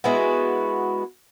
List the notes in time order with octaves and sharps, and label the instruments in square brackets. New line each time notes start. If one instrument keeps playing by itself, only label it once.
[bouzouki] G#3 B3 E4 F#4